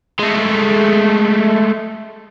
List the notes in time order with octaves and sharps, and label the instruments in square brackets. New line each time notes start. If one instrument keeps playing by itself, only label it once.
[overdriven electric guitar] G#3 A3